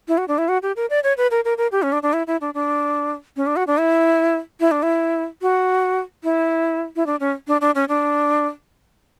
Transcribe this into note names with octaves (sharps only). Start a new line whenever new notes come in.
E4
F#4
D4
E4
F#4
G4
A#4
D5
C#5
B4
A#4
A#4
A#4
G4
C#4
D4
D4
E4
E4
D4
D4
C#4
D4
F#4
D4
E4
E4
D4
E4
F#4
E4
E4
D4
C#4
D4
D4
C#4
D4